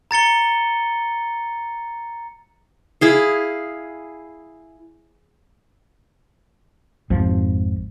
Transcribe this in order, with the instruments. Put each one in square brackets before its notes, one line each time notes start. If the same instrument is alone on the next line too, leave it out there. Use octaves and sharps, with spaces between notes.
[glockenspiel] A#5 A6 C#7 G7
[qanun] E4 G#4 F5
[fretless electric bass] G#1 F2 F3